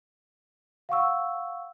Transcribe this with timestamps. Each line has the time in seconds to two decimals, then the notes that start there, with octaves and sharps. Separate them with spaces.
0.89 F5 F#5 C#6 E6